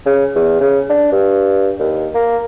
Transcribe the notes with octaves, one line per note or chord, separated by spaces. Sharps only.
C#3
E2
C#3
D4
G2
D#2
A#3